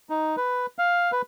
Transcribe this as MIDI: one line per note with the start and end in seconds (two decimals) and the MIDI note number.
0.09 0.36 63
0.37 0.66 71
0.79 1.11 77
1.12 1.22 71